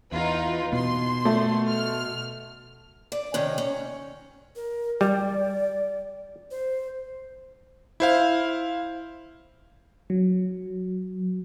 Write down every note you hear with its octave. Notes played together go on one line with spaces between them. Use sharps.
E2 D#4 F4 B4
B2 B3 C6
A3
F6
D5
C3 D#3 C#4
C#4
A#4
G3 D5
C5
E4 C5 F5
F#3